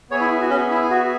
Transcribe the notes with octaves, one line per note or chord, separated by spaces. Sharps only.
B3 G#4 C#5 E5 G#5
E4
E4
F#4
C#4
E4
F#4